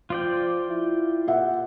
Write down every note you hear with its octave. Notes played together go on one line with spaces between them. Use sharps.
F3 F4 D5 G5
E4
A#2 E5 F#5